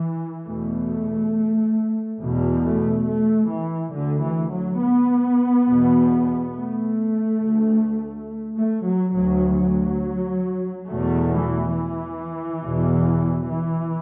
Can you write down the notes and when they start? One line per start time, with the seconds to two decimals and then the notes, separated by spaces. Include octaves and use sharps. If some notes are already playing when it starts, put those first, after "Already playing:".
Already playing: E3
0.46 E2 B2 A3
2.21 E2 B2
2.63 A3
3.07 A3
3.50 E3
3.94 D2 D3
4.23 E3
4.52 F#3
4.81 B3
5.68 E2 B2
6.55 A3
7.42 D2
8.57 A3
8.86 F#3
9.15 D2 F#3
9.58 F#3
10.89 E2 B2 A3
11.32 E3
11.76 E3
12.62 E2 B2
13.49 E3